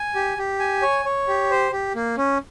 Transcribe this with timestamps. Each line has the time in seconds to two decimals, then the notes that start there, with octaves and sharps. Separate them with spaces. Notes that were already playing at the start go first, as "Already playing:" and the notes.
Already playing: G#5
0.15 G4
0.38 G4
0.60 G#5
0.82 C#5
1.05 C#5
1.28 G4
1.51 C5
1.72 G4
1.95 A#3
2.18 C#4